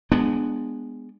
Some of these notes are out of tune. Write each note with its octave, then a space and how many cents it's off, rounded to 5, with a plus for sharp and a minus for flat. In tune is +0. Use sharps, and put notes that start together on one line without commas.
G#3 +0 B3 +0 D4 +15